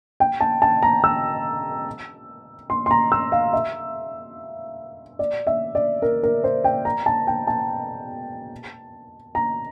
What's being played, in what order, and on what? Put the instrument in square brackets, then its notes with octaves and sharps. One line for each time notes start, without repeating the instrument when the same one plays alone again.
[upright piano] G5
A5
A5
A#5
E6
C6
C6
A#5
E6
F5
E5
D5
E5
D5
A#4
A#4
C5
G5
A#5
A5
G5
A5
A#5